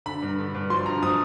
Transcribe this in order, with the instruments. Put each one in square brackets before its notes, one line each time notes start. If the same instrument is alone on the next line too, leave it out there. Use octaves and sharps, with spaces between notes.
[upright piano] D3 B5
G2
D3
G2
F3 C6
D3 A#5
F3 D#6